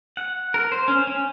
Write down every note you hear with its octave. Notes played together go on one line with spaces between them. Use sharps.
F#5
A#4
C5
C#4
C#4